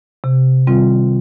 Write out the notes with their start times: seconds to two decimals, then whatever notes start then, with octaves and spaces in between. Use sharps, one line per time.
0.24 C3
0.67 D#3 G3 C4 F4